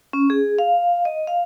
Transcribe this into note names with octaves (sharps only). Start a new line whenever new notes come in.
C#4
G#4
F5
D#5
F5